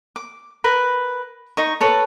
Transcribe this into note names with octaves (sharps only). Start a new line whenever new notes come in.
D6
A#4 B4 B5
D#4 D#5 C#6
A4 B4 C#5 A5